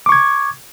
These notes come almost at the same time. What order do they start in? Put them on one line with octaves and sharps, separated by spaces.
D6 C#6 G#6